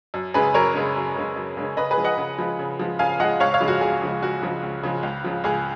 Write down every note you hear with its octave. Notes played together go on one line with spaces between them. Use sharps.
F#2
C#3 G#3 C#4 G#4 B4
F#2 A#4 C#5
C#3 G#3 C#4
F#2
C#3 G#3 C#4
F#2
C#3 G#3 C#4
C#3 B4 D#5
G#4 B4
F3 G#3
D#5 F#5
C#3
F3 G#3
C#3
F3 G#3
C#3 F5 G#5
F3 G#3 D#5 F#5
C#2 C#5 F5
C#5 F5
C#3 F3 G#3
F#4
C#2 G#4
C#3 F3 G#3
C#2 F#4
C#3 F3 G#3
C#2
C#3 F3 G#3
C#2
C#3 F3
C#2 G#4